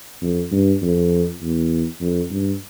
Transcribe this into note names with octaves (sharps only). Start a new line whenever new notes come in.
F2
G2
F2
E2
F2
G2